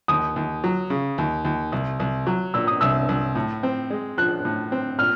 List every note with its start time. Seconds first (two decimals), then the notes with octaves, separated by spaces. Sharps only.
0.08 D#2 D#6
0.36 D#2
0.64 F#3
0.90 C#3
1.18 D#2
1.45 D#2
1.72 C2
2.00 C2
2.27 F#3
2.54 A#2 E6
2.67 D#6
2.81 C2 E6
3.09 C2
3.35 A2
3.63 C4
3.90 G#3
4.18 F3 F#6
4.45 A2
4.72 C4
4.99 A#2 F6